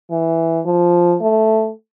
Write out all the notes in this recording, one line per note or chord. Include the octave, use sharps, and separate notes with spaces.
E3
F3
A3